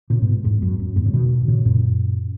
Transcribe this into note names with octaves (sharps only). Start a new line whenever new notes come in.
A#2 C#3
G#2 B2
E2 G#2
F#2
F#2
E2 G#2
C#3
B2 D#3
A#2 C#3
F#2 A#2